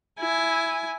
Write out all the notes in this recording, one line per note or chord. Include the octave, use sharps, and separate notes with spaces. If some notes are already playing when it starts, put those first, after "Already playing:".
E4 G#5